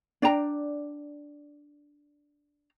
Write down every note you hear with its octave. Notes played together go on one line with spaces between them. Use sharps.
D4 D5 G5 A#5